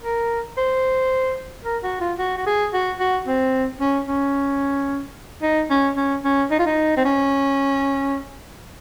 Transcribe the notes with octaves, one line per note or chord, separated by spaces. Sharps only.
A#4
C5
A#4
F#4
F4
F#4
F#4
G#4
F#4
F#4
C4
C#4
C#4
D#4
C#4
C#4
C#4
D#4
F4
D#4
C4
C#4